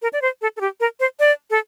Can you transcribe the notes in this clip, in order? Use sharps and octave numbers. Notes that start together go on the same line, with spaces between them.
A#4
D5
C5
A4
A4
G4
A#4
C5
D5
A4